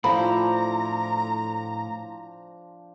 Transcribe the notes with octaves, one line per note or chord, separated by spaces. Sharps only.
A2 F3 D4 E4 C5 A#5 B5